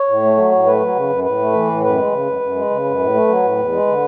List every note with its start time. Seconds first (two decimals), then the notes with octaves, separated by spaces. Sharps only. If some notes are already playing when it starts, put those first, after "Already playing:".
Already playing: C#5
0.08 A2
0.23 A3
0.37 F#3
0.51 A2
0.66 A3 B4
0.81 F#3
0.95 C#3
1.10 F#2
1.24 A2 B4
1.39 A3
1.53 E3
1.68 A2
1.83 F#2 B4
1.97 G#3
2.11 C#3
2.27 F#2
2.41 F#2
2.55 G#3
2.70 C#3
2.84 F#2
2.99 A2
3.14 A3
3.28 F#3
3.43 A2
3.57 E2
3.72 G#3
3.87 D3